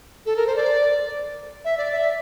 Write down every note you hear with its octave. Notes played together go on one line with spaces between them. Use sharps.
A4
A#4
C5
D5
E5
D5
E5